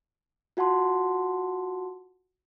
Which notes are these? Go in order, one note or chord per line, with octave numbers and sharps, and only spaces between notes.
F4 F#4 F#5 A5 C6